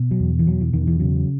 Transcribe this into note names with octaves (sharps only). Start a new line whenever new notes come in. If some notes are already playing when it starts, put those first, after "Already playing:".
Already playing: B2
F#3
E2
E3
B2 F#3
E3
E2 D#3
E3
C#3 F#3